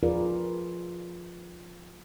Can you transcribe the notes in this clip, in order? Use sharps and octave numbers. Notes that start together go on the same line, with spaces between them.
F3 F4 G#4 A#4 B4 D5